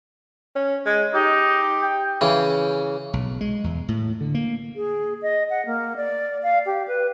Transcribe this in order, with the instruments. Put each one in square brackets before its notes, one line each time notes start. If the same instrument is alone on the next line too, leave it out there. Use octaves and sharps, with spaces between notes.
[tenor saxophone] C#4
G#3
[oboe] D#4 [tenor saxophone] G4
[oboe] G5
[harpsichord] C#3 E3 C#4
[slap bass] B1
G#3
E2
A2
D3
A#3
[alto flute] G#4
D#5
F#5
A#3
D5
F5
G4
B4